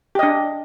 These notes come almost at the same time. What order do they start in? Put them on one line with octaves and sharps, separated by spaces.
G4 D#5 D4